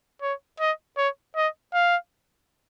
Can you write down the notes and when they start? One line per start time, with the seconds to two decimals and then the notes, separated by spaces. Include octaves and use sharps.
0.22 C#5
0.60 D#5
0.97 C#5
1.36 D#5
1.73 F5